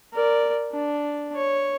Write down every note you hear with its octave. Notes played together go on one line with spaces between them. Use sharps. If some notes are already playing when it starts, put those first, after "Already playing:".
A#4 D5
D4
C#5